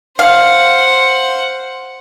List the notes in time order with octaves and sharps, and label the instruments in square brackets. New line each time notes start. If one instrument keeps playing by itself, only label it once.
[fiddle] C5 F#5 [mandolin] F5